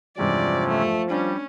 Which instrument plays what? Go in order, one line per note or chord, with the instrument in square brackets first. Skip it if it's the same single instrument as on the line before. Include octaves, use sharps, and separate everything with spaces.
[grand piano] E2 G2 G#3 [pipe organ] C3 C#4 [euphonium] F3 [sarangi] D5
[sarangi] A3
[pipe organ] G3 [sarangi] C#4 [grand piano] D4